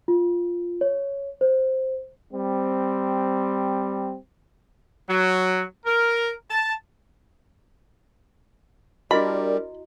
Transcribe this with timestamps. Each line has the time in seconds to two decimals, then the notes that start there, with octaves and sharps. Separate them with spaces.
0.08 F4
0.81 C#5
1.41 C5
2.34 G3 C4
5.09 F#3
5.86 A#4
6.50 A5
9.11 G3 D4 E4 F#4 A#4 D5 D#5 B5